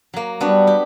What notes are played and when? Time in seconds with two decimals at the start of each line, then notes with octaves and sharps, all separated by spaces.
0.14 F#3 A#3
0.41 G3 B3 D4 F#4
0.67 G4